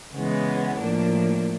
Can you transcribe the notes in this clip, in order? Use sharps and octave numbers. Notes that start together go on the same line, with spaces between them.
C#3 E3 G#3 B3
A2 F3 A#3 D4